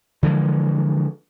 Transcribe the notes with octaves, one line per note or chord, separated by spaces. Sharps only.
D3 E3 F3 G#3